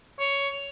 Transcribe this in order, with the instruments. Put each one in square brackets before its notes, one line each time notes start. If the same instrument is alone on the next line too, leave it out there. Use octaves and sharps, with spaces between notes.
[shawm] C#5